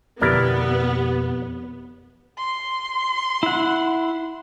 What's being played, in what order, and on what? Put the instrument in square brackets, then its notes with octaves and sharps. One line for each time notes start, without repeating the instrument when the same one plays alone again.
[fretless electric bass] F2 B2 D3 [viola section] B3 [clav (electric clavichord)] E4 A#4 D5 [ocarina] G4
[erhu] C6
[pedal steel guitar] E4 F#5